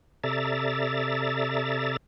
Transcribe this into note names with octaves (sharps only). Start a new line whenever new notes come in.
C3 A4 D5 E5 A#5 A6